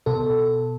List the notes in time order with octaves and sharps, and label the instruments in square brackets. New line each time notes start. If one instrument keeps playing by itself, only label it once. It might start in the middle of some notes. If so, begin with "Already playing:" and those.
[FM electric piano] B2 A4